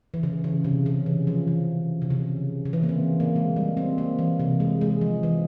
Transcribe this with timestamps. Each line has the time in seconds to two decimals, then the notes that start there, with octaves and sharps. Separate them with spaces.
0.14 E3
0.23 C#3
0.44 C#3
0.64 C3
0.86 C#3
1.06 E3
1.27 F3
1.47 E3
2.02 C3
2.10 C#3
2.65 C#3
2.73 E3
2.83 A#3
2.89 C4
3.20 A#3
3.36 G#3
3.56 G3
3.77 C4
3.98 A#3
4.19 E3
4.40 C3
4.60 G#3
4.81 G#3
5.01 F3
5.23 E3